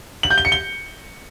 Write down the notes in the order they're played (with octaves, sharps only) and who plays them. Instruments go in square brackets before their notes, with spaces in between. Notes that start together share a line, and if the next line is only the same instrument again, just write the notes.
[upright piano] F#7
G6
G7
C#7
G7